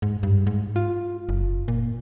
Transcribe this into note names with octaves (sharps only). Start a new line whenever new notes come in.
G#2
G2
G#2
F4
F#1
A#2